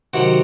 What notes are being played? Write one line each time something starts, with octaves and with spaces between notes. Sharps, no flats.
C3 D#3 F#3 F#4